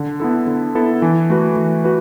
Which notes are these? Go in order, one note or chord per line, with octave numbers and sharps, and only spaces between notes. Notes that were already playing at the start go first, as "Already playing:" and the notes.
Already playing: D3
B3 E4 A4
D3
B3 E4 A4
E3
A3 F#4 B4
E3
F#4 B4